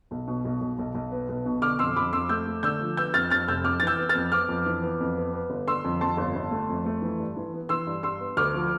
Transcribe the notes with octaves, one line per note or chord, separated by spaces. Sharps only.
B1
B2
B1
B1
B1
B1
B3
B1
B2
D3 D6 F6
F2 C6 E6
F2 B5 D6
F2 C6 E6
A3 E6 G6
A3
D3 E6 G6
F3
B3 E6 G6
F2 F6 A6
F2 F6 A6
F1 E6 G6
F2 D6 F6
A6
E3 E6 G6
B3
F6 A6
F2
B3 D6 F6
F2
E3
B3
F2
B3
B3
G1
D3 C6 E6
F2
F2 A5 C6
G1
G1
A3
F2
A3
E3
G2
E3
B3
E3 C6 E6
G2
G2 C6 E6
B3
D2 D6 F6
F3